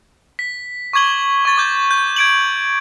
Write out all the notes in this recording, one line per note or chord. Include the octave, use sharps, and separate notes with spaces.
B6
C#6 D6 G#6 F#7 G7
C#6 A6
D6 G6
G6
G#6 D7 F#7